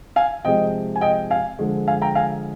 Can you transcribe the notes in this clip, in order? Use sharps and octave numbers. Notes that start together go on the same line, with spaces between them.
F5 G#5
C3 F3 G#3 D#5 G5
G#5
D#5 G5
F5 G#5
D3 F3 G#3
F5 G#5
G5 A#5
F5 G#5